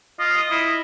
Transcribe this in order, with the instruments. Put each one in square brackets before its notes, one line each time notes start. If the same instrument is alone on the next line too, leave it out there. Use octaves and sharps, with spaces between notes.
[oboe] F4 [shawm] D#5
[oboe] D#6
E4